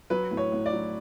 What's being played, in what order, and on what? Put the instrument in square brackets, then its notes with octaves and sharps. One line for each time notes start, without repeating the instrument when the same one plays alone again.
[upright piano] F#3 B4
A2
C#5
A2
D5
F#3